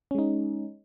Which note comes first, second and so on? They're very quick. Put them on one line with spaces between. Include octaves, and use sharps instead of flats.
C#4 G#3 D#4